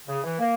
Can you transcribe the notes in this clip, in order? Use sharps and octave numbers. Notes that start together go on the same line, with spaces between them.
C#3
E3
A#3